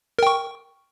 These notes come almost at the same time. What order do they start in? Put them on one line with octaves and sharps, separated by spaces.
A#4 G5 C#6